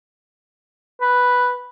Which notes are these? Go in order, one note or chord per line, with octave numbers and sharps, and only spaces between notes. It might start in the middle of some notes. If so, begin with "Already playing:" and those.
B4